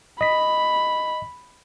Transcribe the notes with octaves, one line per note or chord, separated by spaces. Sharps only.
D#5 B5 B6